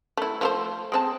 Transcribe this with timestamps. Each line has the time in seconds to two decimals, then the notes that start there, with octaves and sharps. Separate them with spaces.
0.17 A3 E4
0.41 F3 A3 C5
0.92 G#3 C4 A5